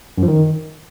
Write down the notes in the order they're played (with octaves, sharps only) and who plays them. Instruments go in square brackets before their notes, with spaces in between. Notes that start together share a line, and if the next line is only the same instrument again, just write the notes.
[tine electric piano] F#2
F3
D#3